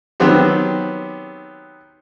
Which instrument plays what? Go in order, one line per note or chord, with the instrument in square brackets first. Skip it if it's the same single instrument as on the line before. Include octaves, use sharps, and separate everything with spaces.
[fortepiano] D#3 F#3 B3 C4 G4